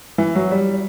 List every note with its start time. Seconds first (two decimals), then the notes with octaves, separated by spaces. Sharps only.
0.18 E3
0.35 F#3
0.51 G3